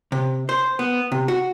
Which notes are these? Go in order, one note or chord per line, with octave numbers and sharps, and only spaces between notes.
C3
C5
B3
C3
F#4